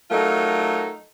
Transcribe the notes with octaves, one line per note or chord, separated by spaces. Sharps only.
F#3 A3 D#4 F4 A4 A#4